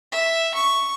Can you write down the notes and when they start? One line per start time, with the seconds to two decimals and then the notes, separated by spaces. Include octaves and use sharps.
0.12 E5
0.55 C#6